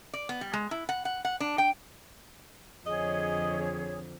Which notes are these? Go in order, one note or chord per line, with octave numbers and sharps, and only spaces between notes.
D5
B3
G3
G#3
E4
F#5
F#5
F#5
D4
G5
F2 D3 G#4 C#5 D#5